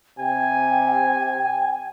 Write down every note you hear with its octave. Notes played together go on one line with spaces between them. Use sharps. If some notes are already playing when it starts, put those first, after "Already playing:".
C3 G5 G#5